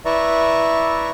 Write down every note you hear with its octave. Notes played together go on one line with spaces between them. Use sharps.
E4 B4 D5 E5 A#5 C#6